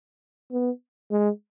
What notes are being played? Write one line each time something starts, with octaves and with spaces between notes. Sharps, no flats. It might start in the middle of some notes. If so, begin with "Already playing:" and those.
B3
G#3